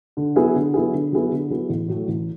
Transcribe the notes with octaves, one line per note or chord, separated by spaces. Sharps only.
D3
F#3 B3 E4 G#4
D3
F#3 B3 E4 G#4
D3
F#3 B3 E4 G#4
D3
F#3 B3 E4 G#4
A1
A2 F#3 A3
A1